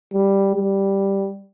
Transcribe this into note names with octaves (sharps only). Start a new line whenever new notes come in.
G3
G3